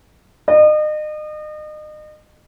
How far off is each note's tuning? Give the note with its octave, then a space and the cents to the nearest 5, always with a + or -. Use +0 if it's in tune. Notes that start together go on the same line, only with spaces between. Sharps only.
D#5 -35